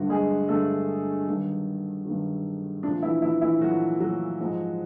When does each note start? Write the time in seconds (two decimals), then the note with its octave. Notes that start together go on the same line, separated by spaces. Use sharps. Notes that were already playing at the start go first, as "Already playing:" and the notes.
Already playing: G2 D3 F#3 A3 F#4
0.09 G#3 G#4
0.48 G2 D3 F#3 A3 A4
1.27 G2 D#3 F#3
2.05 G2 D#3 F#3
2.83 A#2 F3 A3 D4
3.02 E3 E4
3.22 E3 E4
3.41 E3 E4
3.61 A#2 F3 F#3 A3 F#4
4.00 F#3 F#4
4.40 G#2 F3 G#3